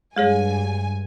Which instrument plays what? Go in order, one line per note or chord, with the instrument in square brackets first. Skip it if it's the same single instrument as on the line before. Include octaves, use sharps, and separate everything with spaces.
[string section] G2 G#5 [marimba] G#3 G#4 C#5